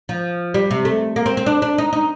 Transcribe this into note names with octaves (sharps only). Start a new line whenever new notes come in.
F3
G3
C3
A3
A#3
C4
C4
D4
D4
D#4
D#4